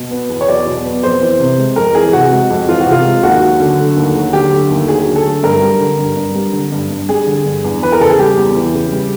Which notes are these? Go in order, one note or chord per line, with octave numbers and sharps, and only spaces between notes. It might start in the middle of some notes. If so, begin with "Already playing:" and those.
Already playing: B2
B3
E2
C#5
F#3 D5
B2
B3
F2 C5
E3
C3
G#3
F2 A#4
E3 G#4
C3 F#4
G#3
F2
E3 F4
F#4
C3
F4
G#3
D#2 F#4
F#3
D3
A3
D#2
F#3
D3 G4
A3
D#2
F#3 G#4
D3
A4
A3
G2 A#4
G3
D3
G2
G2
G3
D3
G2
G2
G3 G#4
D3
G2
E2
E3 B4
A#4
C#3 A4
G#4
G3 G4
E2
E3
C#3
G3